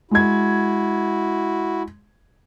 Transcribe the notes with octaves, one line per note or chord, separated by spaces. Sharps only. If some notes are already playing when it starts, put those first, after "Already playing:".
G#3 E4 F#4 G#6